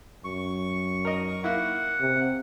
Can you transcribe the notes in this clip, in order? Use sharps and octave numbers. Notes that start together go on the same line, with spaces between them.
F#2 C#6
A#4 D#5
A#3 E4 F#5
C3